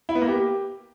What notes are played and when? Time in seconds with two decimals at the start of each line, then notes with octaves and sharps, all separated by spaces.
0.09 E4
0.15 B3
0.22 A#3
0.28 G4